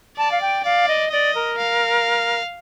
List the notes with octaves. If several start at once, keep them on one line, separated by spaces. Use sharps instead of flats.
D5 A5
F5
G5
D5 F5
D#5
D5 D#5
A#4
F5